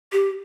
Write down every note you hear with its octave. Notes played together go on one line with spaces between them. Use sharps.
G4